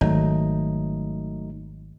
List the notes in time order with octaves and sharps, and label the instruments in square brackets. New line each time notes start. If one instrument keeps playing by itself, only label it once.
[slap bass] G#1 [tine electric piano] F#3 A3 D#4